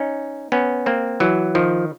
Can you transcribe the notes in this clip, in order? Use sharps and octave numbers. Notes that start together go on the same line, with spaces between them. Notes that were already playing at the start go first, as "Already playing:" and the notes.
Already playing: C#4 D#4
B3 C#4
A#3 C4
E3 F#3
D#3 F3